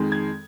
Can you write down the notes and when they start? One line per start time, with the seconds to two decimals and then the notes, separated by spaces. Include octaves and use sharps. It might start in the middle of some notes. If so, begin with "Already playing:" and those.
Already playing: F2 D#3 G#3
0.12 G#6